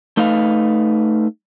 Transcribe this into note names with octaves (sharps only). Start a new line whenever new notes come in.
A3 D#4 B4 F5